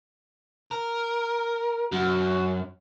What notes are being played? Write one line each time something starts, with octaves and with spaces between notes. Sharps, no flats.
A#4
F#2 F#4